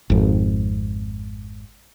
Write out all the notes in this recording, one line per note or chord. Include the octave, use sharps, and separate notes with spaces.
G#1 F2